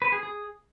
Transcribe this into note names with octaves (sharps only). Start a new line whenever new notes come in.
B4
G#4
G#4